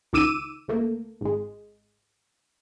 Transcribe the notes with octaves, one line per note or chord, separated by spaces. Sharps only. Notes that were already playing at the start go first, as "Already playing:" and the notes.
C#2 D#3 D6 E6 D#7
C#2 A3 A#3
G#1 G#3